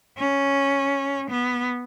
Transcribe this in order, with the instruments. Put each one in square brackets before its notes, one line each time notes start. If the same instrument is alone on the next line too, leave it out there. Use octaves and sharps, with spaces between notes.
[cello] C#4
B3